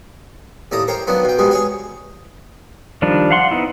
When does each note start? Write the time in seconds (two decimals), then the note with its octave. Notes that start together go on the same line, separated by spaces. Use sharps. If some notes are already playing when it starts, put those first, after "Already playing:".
0.71 D#2 A2 D5 A5 A#5 D#6
0.88 A#4 C5 C#5 G5
1.07 D#3 F3 F#3 B3 D4
1.25 B2 G5
1.38 G#2 B2 D#3 G3 G#3
1.51 G#4 C#5 G#5
3.02 D#3 F3 G3 D4
3.31 F5 F#5 C6
3.51 B3 D#4 E4